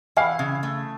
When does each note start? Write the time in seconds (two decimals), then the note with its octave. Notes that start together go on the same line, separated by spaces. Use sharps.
0.16 E3 F5
0.39 C#3
0.63 A3